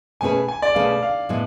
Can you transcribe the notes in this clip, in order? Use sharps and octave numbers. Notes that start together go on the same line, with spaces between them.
B2 A3 C#4 G#4 B4 G#5
G#5
D5
B2 A3 C#4 G#4 B4 F5
F5
A2 G#3 B3